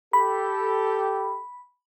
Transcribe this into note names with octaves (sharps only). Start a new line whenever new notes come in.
G4 A4 B5